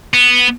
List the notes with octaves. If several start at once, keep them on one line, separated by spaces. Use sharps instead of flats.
B3